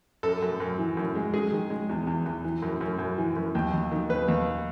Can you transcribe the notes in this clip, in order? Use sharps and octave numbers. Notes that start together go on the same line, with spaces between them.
F#2 A4
F#2
F#2
E3
F#2
G#3
G#3 G#4
D#3
G#3
E2
E2
E2
E3
F#2
F#2
F#2
E3
F#2
D#2
D#2
D#3
D#2 B4
D#2